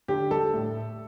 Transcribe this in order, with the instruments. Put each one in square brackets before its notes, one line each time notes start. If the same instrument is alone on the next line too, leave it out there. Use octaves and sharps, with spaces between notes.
[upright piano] D3 G4
G3 A4
A2
A3